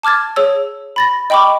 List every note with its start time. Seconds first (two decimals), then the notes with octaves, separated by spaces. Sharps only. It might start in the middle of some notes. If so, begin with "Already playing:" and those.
0.03 A5 D6 F6 G#6 A6
0.36 G#4 C#5 E6
0.96 B5 A6 A#6
1.30 D#5 G5 B5 C#6 D6